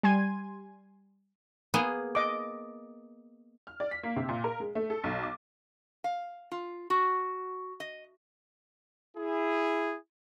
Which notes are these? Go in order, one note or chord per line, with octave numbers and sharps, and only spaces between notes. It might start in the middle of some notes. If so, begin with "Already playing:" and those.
G3 G#5 C6 G#6 D#7
A#3 B3 G#4
D#5 D6
F6
D5
B6
A#3
C3
A#2
A#4
G#3
A3
A4
B1
D6
F5
F4
F#4
D#5
E4 G#4